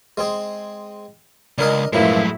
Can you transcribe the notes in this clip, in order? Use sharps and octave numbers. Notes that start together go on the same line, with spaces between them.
G#3 C4 G#4
C#2 D4 A#4 D#5
B1 F#2 A2 F3 F#3 G#3 A3 E4